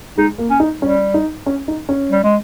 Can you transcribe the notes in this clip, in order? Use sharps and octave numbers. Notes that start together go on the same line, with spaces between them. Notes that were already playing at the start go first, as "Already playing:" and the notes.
G#3 D#4
A#3
C#4
D#4
G3 C#4
D#4
C#4
D#4
C#4
G3
G#3